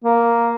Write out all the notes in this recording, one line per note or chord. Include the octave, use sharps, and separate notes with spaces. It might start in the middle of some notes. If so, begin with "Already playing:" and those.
A#3